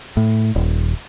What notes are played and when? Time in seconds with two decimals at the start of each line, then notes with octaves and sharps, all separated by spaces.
0.17 A2
0.56 D#1